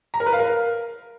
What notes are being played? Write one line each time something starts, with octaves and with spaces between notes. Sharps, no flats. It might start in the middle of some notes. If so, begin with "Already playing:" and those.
A#5
A#4
B4
F5
A#4